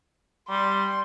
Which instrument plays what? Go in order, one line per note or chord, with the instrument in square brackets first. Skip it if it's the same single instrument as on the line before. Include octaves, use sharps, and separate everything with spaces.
[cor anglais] G3 [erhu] C6